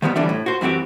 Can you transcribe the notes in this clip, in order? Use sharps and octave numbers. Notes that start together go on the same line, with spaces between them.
D#3 F3 G3 B3
D3 E3 G3 D4 C5 E5
A2
F#4 C5
F#2 E3 C4 F#4 G4